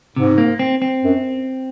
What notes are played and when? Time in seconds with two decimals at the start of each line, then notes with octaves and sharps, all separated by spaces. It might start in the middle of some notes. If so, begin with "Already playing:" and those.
0.16 G#2 C3
0.38 A#3
0.59 C4
0.82 C4
1.04 F#2